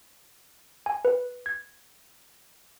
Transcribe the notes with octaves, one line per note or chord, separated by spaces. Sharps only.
G#5
B4
G#6